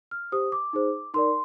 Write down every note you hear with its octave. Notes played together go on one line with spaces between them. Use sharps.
F6
G4 C5 D#6
D6
D#4 G#4 C5
D#4 A#4 D5 C6